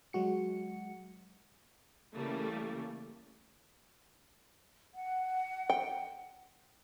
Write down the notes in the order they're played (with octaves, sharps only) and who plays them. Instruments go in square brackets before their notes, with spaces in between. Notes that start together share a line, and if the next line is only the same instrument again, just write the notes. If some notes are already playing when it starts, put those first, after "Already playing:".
[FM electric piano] F#3 G#3 F#4 C#7
[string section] C#3 E3 G3 A3 A#3
[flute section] F#5
[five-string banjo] G5